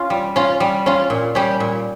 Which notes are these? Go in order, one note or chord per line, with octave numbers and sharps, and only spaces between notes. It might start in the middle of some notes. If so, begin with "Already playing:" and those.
Already playing: C#4 F4
G3
C#4 F4
G3
C#4 F4
A#2
G3 C#4 G4
A#2